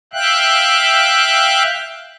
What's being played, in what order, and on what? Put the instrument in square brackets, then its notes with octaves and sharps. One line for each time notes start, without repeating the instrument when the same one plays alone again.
[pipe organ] E5 F5 G5 F#6